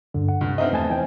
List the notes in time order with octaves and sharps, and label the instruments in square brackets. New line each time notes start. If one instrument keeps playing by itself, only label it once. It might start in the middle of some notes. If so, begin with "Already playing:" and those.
[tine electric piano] D2 G2 [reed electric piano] D3
[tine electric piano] F#5
[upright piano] G2 [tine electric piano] C3
[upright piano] B3 C4 D#4 [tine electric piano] D4 E5 F6 [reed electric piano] D#5
[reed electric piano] E2 G#5 A5 [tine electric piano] A3
[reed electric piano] E3 [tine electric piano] C5 G5 G#5